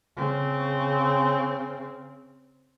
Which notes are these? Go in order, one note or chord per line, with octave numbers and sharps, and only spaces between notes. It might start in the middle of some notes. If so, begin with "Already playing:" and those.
C#3 C4